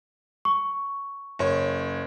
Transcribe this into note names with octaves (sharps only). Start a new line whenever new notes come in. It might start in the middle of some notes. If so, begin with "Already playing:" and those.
C#6
F#1 C#5